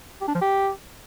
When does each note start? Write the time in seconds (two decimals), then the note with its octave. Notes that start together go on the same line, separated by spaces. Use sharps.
0.21 G4
0.28 D4
0.35 F3
0.41 G4